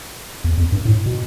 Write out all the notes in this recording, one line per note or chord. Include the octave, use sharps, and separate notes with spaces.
E2
F2
G2
A2
B2